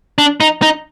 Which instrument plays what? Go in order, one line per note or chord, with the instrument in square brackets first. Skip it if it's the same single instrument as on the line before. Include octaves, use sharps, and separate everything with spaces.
[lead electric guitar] D4
D#4
D#4